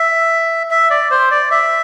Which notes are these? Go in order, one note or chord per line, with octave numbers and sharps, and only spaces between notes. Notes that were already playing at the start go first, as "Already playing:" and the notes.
Already playing: E5
E5
D5
C5
D5
E5